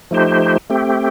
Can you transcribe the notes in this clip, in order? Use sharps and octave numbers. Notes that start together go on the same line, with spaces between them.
F3 A3 D#4 G4 C5
A3 C4 G4